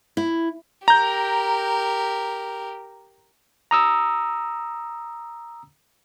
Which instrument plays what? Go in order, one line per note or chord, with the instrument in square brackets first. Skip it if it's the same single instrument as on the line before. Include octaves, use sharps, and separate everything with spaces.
[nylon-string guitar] E4
[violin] G4 A#4 [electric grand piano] A#5 G6
[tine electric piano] A#5 D#6 E6